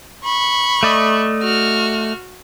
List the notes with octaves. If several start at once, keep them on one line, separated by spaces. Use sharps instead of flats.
B5 C#6
A3 D5 D#5
F#4 F6